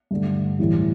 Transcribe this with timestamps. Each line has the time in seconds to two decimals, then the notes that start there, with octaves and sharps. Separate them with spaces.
0.11 G2 D3 A3
0.59 A2 E3 G3